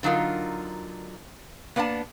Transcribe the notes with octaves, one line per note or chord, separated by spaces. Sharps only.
D3 F#3 D#4 F4 A#4
A#3 B3 D4 F#5 A5